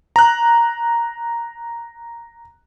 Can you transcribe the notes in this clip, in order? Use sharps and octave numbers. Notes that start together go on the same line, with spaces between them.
A#5 F#6